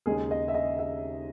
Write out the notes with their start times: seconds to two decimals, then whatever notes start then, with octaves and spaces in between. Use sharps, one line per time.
0.06 D#2 C#3 G#3 D#4 G#4
0.31 D#5
0.48 E5
0.54 D#5
0.79 E5